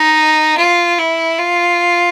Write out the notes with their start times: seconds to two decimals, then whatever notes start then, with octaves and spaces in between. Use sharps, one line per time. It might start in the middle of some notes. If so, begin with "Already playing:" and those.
Already playing: D#4
0.57 F4
0.98 E4
1.39 F4